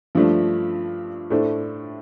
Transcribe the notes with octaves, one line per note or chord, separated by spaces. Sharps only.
G2 F3 A3 D4
A2 A3 D4 A4 C5